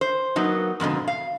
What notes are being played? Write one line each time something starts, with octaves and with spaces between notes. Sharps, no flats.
C5
F#3 A#3 B3 D#4
F2 G#2 B2 D3
F5